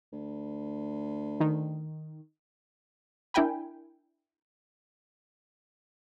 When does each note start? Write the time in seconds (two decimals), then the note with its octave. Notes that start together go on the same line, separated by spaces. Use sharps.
0.13 D2
1.40 D#3
3.34 D4 E4 A#4 G5 G#5 B5